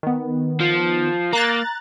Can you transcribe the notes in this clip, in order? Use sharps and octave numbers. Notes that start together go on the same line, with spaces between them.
D#3 B3
F3
A#3 A#5 F#6 A6